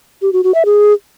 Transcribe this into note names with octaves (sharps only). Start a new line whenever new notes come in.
G4
F#4
F#4
E5
G#4